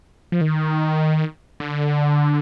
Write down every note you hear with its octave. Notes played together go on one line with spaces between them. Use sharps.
F3
D#3
D3